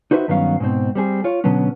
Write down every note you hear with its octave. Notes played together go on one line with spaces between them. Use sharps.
D#4 F#4 B4 C5 E5
G2 D#3 F#3 B3 C#4 F5
G#2 B2 C4
G3 C4 G#4
F4 C#5
B2 D3 F#3 B3 C#4